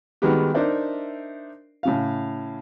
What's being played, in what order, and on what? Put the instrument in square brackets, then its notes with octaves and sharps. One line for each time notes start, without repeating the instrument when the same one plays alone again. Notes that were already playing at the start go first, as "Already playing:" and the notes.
[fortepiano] D#3 G3 G#3 B3 F#4 G4
D4 D#4 A#4 C5 D5 E5
A2 C#3 F5